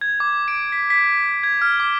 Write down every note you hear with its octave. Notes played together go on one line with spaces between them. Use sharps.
G#6
D6
D7
B6
B6
G#6
F6
D6